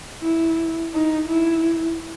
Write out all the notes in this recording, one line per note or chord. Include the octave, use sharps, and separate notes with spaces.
E4
D#4
E4